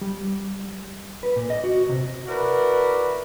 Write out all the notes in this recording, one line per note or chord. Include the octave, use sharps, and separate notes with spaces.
G3
B4
A#2
D#5
F#4
C3
E4 F#4 A#4 B4 D5